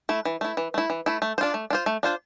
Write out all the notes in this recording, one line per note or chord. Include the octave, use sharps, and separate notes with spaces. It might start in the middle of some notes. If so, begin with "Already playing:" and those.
A3 E4
E3
A3 E4
E3
A3 E4
E3
A3 E4
A3
C5
D4 F4
A3
D4 F4 C5
A3
D4 F4 C5